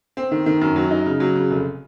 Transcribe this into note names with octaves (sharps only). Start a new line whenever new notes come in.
C4
D#3
D#3
F#2
F#3
D#4
C#3
F#3
C#3
F1